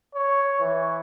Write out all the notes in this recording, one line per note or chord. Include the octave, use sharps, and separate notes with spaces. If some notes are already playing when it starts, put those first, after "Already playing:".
C#5
E3